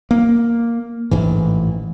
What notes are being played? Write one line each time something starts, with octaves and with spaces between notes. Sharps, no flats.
A#3
A1 G#2 E3